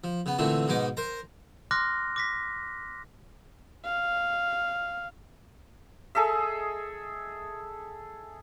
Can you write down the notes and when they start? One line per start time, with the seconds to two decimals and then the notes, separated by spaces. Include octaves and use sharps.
0.04 F3
0.26 C#3 B3
0.38 A#2 D3 E3 A3 C4
0.68 G#2 B2 G#3 D#4 D6
0.97 A#4 C5 A#5
1.71 C6 D6 F6 F#6 A#6
2.16 D6 A#6 B6
3.85 F5
6.15 G#4 A4 D#5 E5